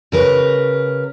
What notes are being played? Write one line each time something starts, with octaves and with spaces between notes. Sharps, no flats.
C#3 A#4 B4